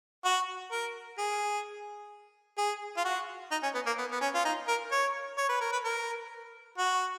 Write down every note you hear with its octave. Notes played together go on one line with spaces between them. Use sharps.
F#4
A#4
G#4
G#4
F4
F#4
D#4
C#4
B3
A#3
B3
B3
C#4
F4
D#4
A#4
C#5
C#5
B4
A#4
B4
A#4
F#4